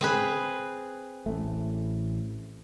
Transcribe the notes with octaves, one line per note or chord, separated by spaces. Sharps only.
C4 G#4 B4
A1 A3